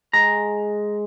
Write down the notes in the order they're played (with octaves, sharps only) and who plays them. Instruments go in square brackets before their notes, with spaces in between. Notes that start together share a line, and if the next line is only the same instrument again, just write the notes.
[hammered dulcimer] G#3 [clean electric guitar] A#5